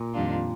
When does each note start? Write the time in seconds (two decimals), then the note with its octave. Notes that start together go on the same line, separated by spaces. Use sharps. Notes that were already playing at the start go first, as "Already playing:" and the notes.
Already playing: A#2
0.13 F2 D#3 G3 D4 F4